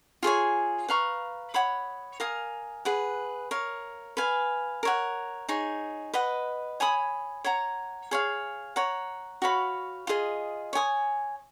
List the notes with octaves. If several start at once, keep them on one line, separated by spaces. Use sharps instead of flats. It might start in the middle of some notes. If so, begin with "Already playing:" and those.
F4 G#4 C#5 G#5
B4 F5 A#5 C#6
C#5 F#5 B5 D#6
A#4 F5 G#5 D#6
G#4 B4 F#5
A#4 C#5 F5
B4 F5 G#5
A#4 C#5 F#5
D#4 G#4 C#5
B4 D#5 F#5
C#5 G#5 B5 D#6
C#5 F#5 A#5
G#4 C#5 F5
C#5 F#5 A#5
F#4 C#5 F5 B5
F4 G#4 D#5
C#5 G#5 D#6